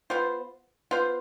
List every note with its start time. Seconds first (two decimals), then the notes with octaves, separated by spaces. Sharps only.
0.10 B3 F4 C5
0.91 B3 F4 C5